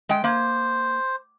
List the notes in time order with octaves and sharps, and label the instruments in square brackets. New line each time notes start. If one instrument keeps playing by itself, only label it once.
[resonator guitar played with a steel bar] G#3 G5
[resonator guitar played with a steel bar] A#3 [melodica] C5